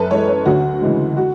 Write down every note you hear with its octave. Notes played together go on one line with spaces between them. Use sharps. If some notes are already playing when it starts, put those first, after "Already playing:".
Already playing: F#2 A4 B4
E3 G#3 C#5
C#5
D2 F#4
C#3 E3 G#3
F#4